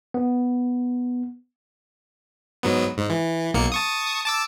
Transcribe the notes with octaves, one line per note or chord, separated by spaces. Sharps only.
B3
G#2 F#3 B3
G#2
E3
B1 A#3 C#7
A5 C#6 D#6
A5 D6 E6